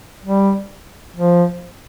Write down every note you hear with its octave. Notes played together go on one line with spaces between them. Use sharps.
G3
F3